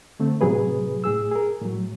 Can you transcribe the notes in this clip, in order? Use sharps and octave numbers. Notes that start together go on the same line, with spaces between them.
D3 A3 C4
A2 C3 F#3 G#4 B4
A2 G#4 E6
G#4 A#4
A2 F#3